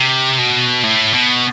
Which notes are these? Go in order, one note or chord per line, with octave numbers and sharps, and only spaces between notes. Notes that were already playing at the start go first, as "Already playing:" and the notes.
Already playing: C3
B2
A2
B2